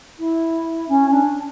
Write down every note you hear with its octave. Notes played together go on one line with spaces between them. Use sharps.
E4
C#4
D4